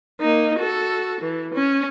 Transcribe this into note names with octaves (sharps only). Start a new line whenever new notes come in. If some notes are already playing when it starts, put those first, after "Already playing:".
A#3 D#4
F#4 A4
E3
C#4